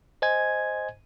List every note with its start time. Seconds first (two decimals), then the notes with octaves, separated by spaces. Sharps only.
0.22 C5 D#5 G#5 G#6